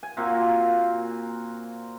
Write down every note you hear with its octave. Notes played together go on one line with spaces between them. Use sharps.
G#5
A#2 A#3 C4 F#4